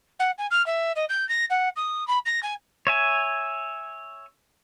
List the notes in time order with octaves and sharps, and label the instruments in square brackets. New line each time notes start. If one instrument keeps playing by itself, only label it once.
[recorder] F#5
G#5
F6
E5
D#5
G6
A#6
F#5
D#6
B5
A#6
G#5
[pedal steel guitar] C#5 E5 G#5